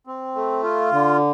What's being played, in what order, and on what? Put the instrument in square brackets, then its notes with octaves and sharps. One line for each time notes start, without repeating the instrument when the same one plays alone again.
[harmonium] C4
A3
F4
D3